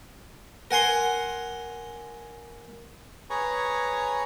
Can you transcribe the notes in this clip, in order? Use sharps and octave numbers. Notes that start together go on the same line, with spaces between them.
A#4 F#5 G#5 C6
G#4 B4 C#5 G#5 A#5 C#6